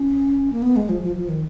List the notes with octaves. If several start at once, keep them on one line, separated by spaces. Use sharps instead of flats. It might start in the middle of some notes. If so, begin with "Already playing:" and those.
Already playing: C#4
A#3
B3
G#3
F3
F3
F3
D#3